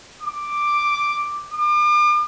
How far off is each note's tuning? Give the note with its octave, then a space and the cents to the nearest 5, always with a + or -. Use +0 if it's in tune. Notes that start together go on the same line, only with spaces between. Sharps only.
D6 +5
D6 +40